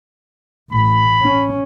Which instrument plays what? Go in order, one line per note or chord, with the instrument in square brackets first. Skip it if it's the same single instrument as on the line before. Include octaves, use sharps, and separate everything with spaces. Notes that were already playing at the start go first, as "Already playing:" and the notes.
[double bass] A1 A2 [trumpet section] B5
[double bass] C#4